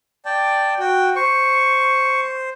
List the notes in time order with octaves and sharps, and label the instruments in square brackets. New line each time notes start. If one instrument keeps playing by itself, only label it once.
[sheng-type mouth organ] D5 G5 A5
F#4 G5
[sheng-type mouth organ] C5 [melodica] C#6